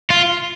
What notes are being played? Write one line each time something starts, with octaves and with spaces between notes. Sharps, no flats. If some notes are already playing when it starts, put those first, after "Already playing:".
F4